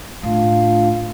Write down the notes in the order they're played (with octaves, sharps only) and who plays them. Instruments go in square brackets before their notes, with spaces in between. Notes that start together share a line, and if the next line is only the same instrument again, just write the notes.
[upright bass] A2 [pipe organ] D4 F4 F5